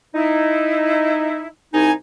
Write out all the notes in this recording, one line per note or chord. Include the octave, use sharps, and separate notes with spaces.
D#4 E4
C2 D#4 G#5